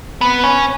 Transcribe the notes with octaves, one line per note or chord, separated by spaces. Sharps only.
B3
C#4